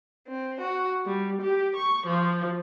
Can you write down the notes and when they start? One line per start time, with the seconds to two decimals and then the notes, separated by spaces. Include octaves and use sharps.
0.27 C4
0.61 F#4
1.06 G3
1.42 G4
1.76 C#6
2.06 F3